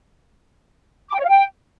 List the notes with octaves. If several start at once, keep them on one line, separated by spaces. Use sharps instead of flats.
D6
G5
C#5
F5
G5